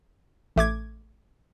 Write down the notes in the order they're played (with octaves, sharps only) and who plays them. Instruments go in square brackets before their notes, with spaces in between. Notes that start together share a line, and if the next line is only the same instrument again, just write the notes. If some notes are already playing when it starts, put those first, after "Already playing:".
[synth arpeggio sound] A1 A3 D6 G#6